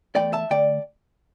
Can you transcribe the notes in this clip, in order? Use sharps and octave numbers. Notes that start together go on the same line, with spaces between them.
E2 C3 A3 D5 G5
E5 A5
D3 A3 D5 G5